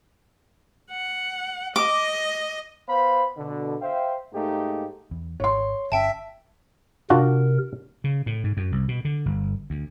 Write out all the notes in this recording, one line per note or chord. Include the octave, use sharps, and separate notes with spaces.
F#5
D#5 D6
B3 C5 F5 B5
B2 D3
C5 E5 F5 G5
G#2 A3 A#3 D#4 G4
E2
G#1 C#5 C6
G1 C#4 E5 G5 A5
C3 D4 F4 F#4 A#4
C#3
A2
G#2
F#2
C2
B2
D3
G1
D2